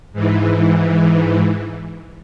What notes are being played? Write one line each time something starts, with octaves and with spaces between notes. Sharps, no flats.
G#2 E3